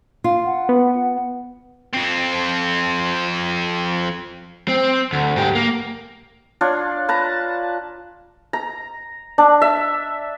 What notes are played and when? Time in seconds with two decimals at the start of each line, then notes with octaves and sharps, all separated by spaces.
0.24 F4
0.46 F#5
0.69 B3
1.94 F2 C4
4.68 C4
5.13 D2
5.37 G#2 G4
5.55 A#3
6.61 D4 F4 C#5
7.08 B4 A5 A#5
8.53 A#5
9.38 D4
9.62 E5